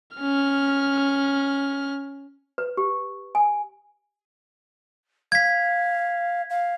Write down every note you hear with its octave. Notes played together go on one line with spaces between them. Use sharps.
C#4 F6
B4
G4
G#5
F5 G#6 B6
F5